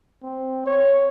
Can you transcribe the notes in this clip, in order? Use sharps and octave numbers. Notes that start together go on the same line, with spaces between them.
C4
C#5